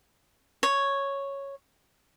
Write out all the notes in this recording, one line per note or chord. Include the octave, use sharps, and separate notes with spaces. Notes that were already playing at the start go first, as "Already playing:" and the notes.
C#5